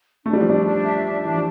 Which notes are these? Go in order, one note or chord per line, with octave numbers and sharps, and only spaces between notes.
A3 D4
G3
F3
G3 D4
D4
E5
D4
E3 D4
F3